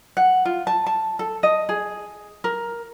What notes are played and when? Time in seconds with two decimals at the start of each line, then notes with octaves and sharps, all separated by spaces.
0.17 F#5
0.45 F4
0.67 A5
0.86 A5
1.19 A4
1.43 D#5
1.69 G#4
2.44 A#4